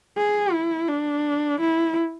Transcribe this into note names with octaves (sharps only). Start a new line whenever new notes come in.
G#4
E4
D4
E4